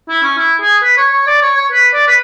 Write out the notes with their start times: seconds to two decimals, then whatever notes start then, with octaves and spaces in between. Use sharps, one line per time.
0.09 E4
0.23 C#4
0.38 E4
0.61 G#4
0.83 B4
0.97 C#5
1.13 C#5
1.27 D5
1.42 C#5
1.56 C#5
1.72 B4
1.93 D5
2.08 B4